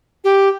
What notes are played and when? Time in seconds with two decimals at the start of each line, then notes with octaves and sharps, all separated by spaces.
0.24 G4